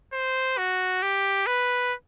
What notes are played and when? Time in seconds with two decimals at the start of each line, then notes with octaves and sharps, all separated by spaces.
0.13 C5
0.57 F#4
1.02 G4
1.46 B4